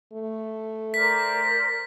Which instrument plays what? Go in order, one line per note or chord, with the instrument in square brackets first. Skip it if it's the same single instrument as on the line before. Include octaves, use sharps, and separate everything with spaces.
[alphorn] A3
[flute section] A#4 C5 D5 [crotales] B6